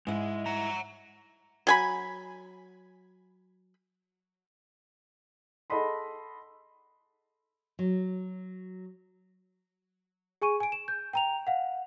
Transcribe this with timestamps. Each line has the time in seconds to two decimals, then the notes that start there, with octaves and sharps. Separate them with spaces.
0.07 G#2 G#3 E4
0.46 F#5 A#5
1.67 F#3 G#5 B5
5.70 G#4 A4 D#5 F#5 B5 C6
7.79 F#3
10.42 G#4 G#5 C#6 D#7
10.60 G#5 D7
10.72 E7
10.88 G6
11.13 G5 A#5 F7
11.47 F5 F#5